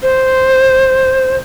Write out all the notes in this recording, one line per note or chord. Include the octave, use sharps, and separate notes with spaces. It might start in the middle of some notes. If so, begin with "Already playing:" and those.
C5